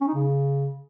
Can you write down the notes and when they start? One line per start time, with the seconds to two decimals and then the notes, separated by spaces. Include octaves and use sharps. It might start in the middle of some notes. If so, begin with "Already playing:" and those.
0.01 C#4
0.08 D#4
0.14 C#3